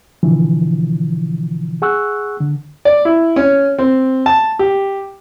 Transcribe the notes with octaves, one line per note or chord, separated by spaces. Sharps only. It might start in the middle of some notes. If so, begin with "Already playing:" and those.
B2 D3 E3 F3
G#4 F#5 C#6 E6 F#6
D3
D5
E4
C#4
C4
A5
G4